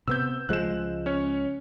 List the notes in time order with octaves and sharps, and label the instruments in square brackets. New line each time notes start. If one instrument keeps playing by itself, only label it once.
[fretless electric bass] C3 B3 [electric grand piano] E6 G6
[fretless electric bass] C#2 F3 G#3 [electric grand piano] F#6 E7
[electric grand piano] C#4 C#5